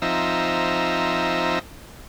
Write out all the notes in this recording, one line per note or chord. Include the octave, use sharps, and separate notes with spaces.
F3 C4 D#4 E5 A#5